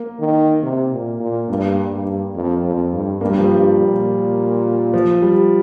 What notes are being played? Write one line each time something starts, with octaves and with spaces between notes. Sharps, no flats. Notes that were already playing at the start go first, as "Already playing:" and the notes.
Already playing: A#3
D#3
C3
A#2
A#2
G2 A#3
G2
F2
F2
G2
G2 A#3
G3
F3
G2 G3
A#2
F3
G3